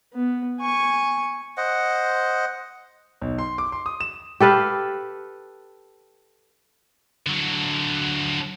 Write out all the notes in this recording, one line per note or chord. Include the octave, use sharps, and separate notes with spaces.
B3
G#5 C#6
C5 D#5 F#5
B1
C6
D6
C6
D#6
E7
G4 A4 B4 F5
D3 F#3